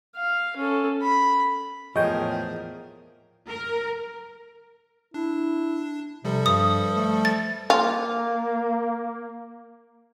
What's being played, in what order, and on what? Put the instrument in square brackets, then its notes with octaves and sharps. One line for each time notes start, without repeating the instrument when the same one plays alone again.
[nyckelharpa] F5
C#4 A4
B5
[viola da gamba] E2 A2 A#4 [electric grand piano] F3 G#4 [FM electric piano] C#5 G5 [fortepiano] D#5
[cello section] A#4
[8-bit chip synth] D4 [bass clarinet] E4
[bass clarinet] C3 [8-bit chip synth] F3 G3 A4
[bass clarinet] G2 [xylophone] D#6
[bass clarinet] A3
[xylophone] A6
[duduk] A#3 [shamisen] F4